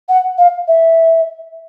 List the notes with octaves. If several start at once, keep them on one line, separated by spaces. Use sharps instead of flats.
F#5
F5
E5